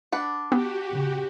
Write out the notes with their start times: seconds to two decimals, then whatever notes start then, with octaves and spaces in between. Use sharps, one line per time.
0.12 D4 B4 F#5
0.52 B3 F#4 G4
0.92 C#3